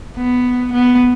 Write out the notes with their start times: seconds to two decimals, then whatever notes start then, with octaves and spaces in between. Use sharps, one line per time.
0.17 B3
0.73 B3